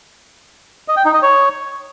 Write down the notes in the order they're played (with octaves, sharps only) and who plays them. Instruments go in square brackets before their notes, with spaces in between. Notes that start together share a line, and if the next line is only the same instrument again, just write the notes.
[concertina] D#5
G5
D#4
D#5
C#5